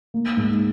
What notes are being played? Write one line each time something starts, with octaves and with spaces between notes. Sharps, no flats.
A#3
G#2